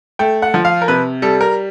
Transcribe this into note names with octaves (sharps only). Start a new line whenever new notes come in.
A3 G5
F#5
F3
F5
A#4
C3 B4
G3 A4
A#4